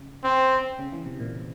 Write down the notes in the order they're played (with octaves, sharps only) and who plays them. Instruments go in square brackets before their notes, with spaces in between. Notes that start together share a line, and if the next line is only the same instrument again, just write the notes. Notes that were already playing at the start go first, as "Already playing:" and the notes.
Already playing: [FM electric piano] C#3
[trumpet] C4
[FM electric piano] C#3
E3
C3
A#2